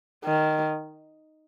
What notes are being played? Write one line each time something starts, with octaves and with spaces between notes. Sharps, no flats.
D#3